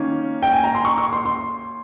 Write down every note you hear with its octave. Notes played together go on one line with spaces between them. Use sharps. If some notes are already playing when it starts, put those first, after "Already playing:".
Already playing: D#3 A#3 C#4
G5
G#5
A#5
C6
C#6
C#6
C6
C6